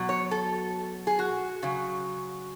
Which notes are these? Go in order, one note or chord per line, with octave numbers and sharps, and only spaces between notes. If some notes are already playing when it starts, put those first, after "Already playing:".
Already playing: B2 F#3
C#5
A4
G#4
F#4
C#3 F#3